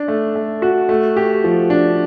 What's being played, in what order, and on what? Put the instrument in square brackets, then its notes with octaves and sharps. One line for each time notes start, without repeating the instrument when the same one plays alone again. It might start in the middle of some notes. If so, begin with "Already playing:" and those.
Already playing: [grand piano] D4
A3
A3
F#4
A3
G4
F3
D4